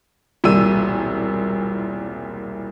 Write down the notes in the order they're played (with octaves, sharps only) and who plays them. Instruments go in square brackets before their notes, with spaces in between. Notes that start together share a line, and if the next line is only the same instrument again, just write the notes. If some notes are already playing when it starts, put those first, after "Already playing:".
[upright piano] E1 C2 A#2 G3 E6 D#7